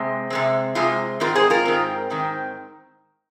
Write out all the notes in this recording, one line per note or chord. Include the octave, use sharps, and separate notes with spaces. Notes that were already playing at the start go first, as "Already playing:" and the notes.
Already playing: C3 G#3 C4
C3 G#3 C4
C3 G#3 C4 F4
G#2 D#3 C4 F4 A#4
G#4 C5
F4 A#4
G#2 D#3 C4
G#2 D#3 C4